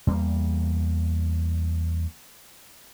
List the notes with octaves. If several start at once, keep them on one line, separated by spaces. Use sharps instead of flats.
E2 G3 A#3